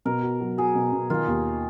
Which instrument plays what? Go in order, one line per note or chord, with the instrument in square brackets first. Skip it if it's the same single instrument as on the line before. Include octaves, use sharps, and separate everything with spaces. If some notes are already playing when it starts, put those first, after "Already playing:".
[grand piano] B2 [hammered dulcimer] A#4
[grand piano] F#4
F#3
[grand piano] F#3 [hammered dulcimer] G#4
[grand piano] B2
B2
[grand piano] D#3 [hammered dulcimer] F4
[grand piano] D#2